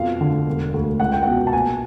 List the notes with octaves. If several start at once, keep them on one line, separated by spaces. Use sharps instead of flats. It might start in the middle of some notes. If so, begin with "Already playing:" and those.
Already playing: F2 B2 F5
D3
E1
D2
C#2 F#5
G5
B2 F#5
A5
A#1 G#5